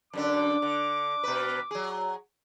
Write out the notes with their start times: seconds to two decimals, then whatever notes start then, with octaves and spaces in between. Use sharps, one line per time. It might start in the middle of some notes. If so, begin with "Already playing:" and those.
0.13 F#2 D3 D4 D6
0.62 D3
1.23 B2 B4
1.71 F#3 G#4